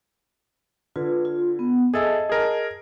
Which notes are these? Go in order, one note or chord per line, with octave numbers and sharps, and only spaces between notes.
D3 F4 B4
F4
B3
G#4 A4 D#5 E5 A5
G#4 A#4